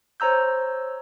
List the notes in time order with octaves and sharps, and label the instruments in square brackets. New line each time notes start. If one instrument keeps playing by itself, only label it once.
[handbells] C5 C#5 A#5 E6 G6